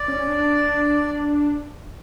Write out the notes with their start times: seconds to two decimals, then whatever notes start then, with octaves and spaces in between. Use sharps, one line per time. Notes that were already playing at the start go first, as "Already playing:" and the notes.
Already playing: D5
0.08 C#4
0.28 D4